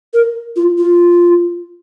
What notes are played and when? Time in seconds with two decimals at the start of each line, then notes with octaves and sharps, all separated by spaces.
0.14 A#4
0.56 F4
0.78 F4